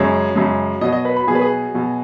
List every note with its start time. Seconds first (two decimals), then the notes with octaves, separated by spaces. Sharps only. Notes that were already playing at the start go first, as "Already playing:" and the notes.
Already playing: F#2 C#3 G#3 C#5
0.35 F#2 C#3 G#3
0.81 B2 F#3 D#5
0.93 D#5
1.05 B4
1.16 B5
1.27 B2 F#3 G#4
1.35 B4
1.41 G#4
1.74 B2 F#3